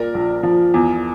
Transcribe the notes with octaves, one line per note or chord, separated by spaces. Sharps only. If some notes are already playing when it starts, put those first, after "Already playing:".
Already playing: A#2 A#4 D5
A#1
F3
E2